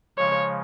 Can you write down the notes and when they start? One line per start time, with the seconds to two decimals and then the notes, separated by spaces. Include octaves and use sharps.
0.18 C#3 F3 G#3 C#5